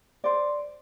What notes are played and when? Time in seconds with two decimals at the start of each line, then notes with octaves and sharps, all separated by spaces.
0.24 C5 D5